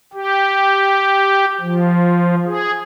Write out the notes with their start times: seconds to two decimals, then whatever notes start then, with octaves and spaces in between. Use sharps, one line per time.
0.13 G4
1.61 F3
2.46 G#4